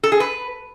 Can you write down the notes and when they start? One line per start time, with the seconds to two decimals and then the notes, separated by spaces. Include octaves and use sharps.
0.03 A4
0.12 G#4
0.20 B4